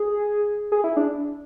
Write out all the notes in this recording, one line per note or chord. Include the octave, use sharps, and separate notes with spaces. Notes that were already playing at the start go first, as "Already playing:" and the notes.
Already playing: G#4
G#4
E4
D4